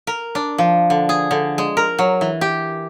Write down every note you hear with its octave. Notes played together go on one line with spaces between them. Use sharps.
A#4
D4
F3
D3
G#4
D3
G#3
A#4
F#3
E3
G4